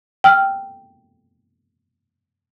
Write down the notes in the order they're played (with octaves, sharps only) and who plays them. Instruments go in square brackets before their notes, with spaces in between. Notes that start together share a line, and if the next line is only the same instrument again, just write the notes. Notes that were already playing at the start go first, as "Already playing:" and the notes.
[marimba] G5 E6 F6